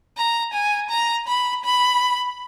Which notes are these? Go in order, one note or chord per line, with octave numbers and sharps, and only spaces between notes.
A#5
G#5
A#5
B5
B5